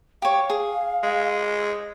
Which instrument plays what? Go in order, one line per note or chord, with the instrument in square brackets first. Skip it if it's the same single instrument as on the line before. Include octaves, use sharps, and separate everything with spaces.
[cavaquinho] G4 C#5 [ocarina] F5
[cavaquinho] G#4
[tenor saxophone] G#3